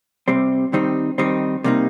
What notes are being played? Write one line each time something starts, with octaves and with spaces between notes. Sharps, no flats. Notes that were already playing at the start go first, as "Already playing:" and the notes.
C3 G3 C4
D#3 G3 C4 D#4
D#3 G3 C4 D#4
C3 G3 A#3 D#4